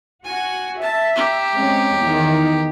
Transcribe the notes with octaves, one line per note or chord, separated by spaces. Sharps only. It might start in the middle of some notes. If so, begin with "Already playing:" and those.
F#4 G#5
E5 A5
G4 A#5
G#3 C4 C#4
E2 D#3